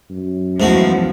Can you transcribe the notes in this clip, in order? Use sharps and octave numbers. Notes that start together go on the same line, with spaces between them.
F#2
E2 G#2 F3 F#3 A3 F#4